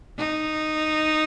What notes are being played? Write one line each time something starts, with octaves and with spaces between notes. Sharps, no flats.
D#4